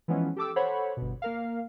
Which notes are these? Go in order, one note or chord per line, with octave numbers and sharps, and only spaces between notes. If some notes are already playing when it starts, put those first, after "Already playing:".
E3 F3 G#3 B3 C#4
G4 A4 D6 E6
A4 C5 C#5 F#5 B5
G1 B2
A#3 A#4 F5